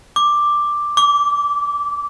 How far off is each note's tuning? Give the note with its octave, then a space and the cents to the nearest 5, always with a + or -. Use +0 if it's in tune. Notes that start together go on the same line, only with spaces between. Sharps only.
D6 +5
D6 -20